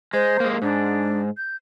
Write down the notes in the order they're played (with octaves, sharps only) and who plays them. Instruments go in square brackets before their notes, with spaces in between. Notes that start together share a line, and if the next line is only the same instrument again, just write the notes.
[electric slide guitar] G#3 [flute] C5
[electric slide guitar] G#3 A#3
[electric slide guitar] G#2 [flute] D4
[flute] G6